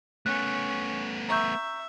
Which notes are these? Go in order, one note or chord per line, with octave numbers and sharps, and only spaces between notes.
A3 B3 C#4 F#6
E5 A#5 C#6 G6